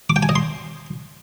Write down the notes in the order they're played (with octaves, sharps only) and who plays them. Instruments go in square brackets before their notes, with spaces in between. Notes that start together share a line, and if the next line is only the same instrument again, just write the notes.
[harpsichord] D6
G5
G#5
D#5
C6